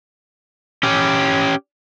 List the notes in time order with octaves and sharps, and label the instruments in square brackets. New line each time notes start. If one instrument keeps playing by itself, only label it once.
[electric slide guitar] C#4 G4